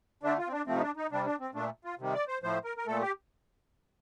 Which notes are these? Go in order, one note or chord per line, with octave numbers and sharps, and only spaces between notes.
D3 A3 D4
F4
C4
D4
C3 F3 A3 C4
D#4
D4
D#4
C3 G3 D4
D4
C4
A#2 A3 D4
F4
C3 D#3 G3
D5
C5
A2 F3 A3 C5
A#4
A#4
A#2 A3 A4
G4